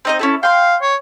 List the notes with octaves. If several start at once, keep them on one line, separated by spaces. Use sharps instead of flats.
C4 D#4 D#5
C#4 E4 A4
F5 G5 C6
C#5